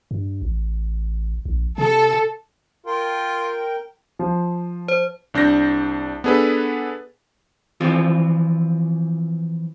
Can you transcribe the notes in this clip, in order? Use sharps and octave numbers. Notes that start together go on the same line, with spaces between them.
G2
A1
A#1
C3 A4
F4 A#4 G5
F3
C5
C2 D4 G6 A#6
B3 D4 G#4 A4 B4
E3 F3 C4 F4